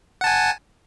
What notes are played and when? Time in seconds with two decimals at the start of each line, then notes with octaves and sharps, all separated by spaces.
0.21 F#5
0.24 A5
0.27 G#5